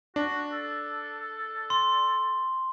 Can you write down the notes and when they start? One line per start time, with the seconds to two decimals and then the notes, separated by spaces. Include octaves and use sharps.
0.16 D4 F#4
0.52 A4
1.70 C6